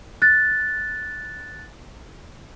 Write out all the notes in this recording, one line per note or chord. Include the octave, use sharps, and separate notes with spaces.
F#6 A6